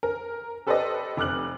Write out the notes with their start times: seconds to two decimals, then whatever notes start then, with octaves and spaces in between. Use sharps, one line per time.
0.03 A#4
0.67 G4 A4 B4 C5 D5 D#5
1.17 F1 D6 F6 F#6 F#7